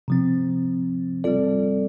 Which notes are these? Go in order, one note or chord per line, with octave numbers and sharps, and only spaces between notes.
C3 F3 C4
G3 C4 F4 A4 D5